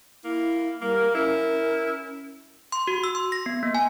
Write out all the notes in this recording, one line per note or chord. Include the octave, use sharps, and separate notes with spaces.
A#3 E4
G3 A#3 A#4
C#4 E4 A#4
C6
F#4
E6
C6
A#6
B3
A#3
G#5